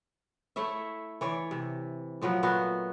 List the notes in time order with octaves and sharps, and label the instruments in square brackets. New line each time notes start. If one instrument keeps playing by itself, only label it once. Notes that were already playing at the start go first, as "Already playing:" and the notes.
[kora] A3 E4 C#5 E5
E3 C#5 D5
C3
A#2 F3 F#3 B3
A#2 A3 B3 F#4